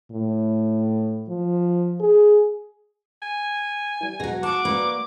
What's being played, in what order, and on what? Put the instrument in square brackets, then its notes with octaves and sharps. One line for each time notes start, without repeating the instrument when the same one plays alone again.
[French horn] A2
F3
G#4
[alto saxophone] G#5
[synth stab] E3 G3
[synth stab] E2 G#3 A#6 [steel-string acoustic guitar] B2 F#3
[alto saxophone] F#4 [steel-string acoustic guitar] A5 [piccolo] D6
[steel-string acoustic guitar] A#3 [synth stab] B4 D5